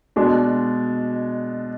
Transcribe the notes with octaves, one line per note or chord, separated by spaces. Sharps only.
B2 G#3 D4